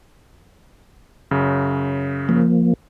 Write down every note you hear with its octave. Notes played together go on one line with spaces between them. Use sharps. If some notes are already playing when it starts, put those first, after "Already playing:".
F#2 C#3
F3 A#3